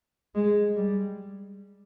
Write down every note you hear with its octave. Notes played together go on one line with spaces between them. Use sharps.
G#3
G3